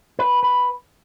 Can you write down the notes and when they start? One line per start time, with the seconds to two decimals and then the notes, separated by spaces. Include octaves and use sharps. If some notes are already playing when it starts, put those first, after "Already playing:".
0.19 B4
0.43 B4